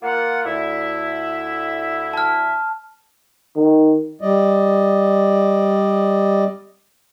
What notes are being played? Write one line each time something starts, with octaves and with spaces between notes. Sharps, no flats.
A#3 F4 F#5
D2 E4 E5
A5 F6
D#3
G3 D5 D#5